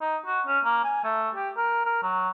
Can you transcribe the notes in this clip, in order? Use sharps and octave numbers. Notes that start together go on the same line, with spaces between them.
D#4
F#4
C#4
A#3
G#5
A3
G4
A#4
A#4
F#3